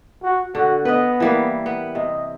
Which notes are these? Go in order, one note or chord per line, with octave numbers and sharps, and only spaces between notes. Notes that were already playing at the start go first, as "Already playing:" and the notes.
F#4
D3 F#4
B3 B4 D#5
E3 G3 A#3
B3
C3 D#5